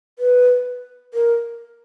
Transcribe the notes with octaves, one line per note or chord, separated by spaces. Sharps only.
B4
A#4